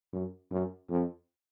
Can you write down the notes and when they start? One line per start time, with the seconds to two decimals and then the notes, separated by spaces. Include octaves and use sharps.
0.13 F#2
0.51 F#2
0.90 F2